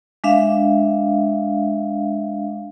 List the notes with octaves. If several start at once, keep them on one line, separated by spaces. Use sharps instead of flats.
G#3 D4 E5 F5